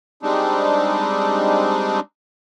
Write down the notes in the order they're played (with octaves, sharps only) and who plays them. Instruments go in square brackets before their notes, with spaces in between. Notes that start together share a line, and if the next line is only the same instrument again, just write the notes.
[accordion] G3 G#3 C4 D4 D#4